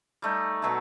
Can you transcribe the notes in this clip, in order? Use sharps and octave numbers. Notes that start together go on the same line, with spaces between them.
G3 A3 D#4
B2 F#3 E5 A5